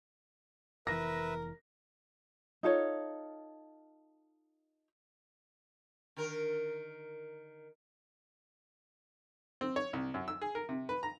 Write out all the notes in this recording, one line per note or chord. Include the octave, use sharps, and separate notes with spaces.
F1 E3 A#4 B4 E5 A#6
D#4 F4 A4 C#5
D3 D#3 A#4
C4
C#5
C2
F#2
E6
G#4
A#4
C3
B4
A#5